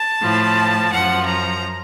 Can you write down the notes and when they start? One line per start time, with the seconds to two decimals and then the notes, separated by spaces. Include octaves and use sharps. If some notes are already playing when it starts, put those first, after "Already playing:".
Already playing: A5
0.21 A2 F3
0.92 F#2 F3 F#5
1.26 A#5